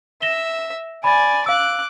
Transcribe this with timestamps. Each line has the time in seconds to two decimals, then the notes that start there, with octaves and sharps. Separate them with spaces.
0.22 E5 A#6 E7 G7
1.04 D5 G#5 B5 A6
1.46 F5 D6 E6 F#6